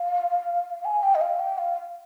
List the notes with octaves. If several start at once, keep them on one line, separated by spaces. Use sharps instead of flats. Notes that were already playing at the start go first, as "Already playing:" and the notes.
Already playing: F5
G#5
G5
D#5
F5
G5
F5